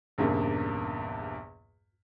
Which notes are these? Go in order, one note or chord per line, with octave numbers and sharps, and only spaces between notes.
A#1 E2 G2 C#3 A#3